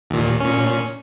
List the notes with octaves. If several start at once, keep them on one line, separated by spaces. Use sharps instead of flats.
D#2 A#2
A#2 C#4